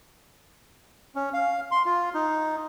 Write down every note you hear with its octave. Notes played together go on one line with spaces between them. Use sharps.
C#4
F5
C6
F4
D#4